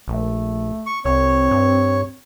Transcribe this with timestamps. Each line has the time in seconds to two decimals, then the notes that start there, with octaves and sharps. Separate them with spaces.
0.08 A#1 A3
0.86 C#6
1.05 C2 C4 C#5
1.51 G2